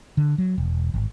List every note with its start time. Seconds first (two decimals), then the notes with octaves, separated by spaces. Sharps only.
0.17 D3
0.38 F#3
0.58 E1
0.94 G#1